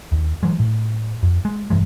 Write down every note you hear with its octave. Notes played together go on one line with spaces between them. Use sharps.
D#2
E3 F#3 G#3
A2
F2
G#3
F1 G2 E3 G#3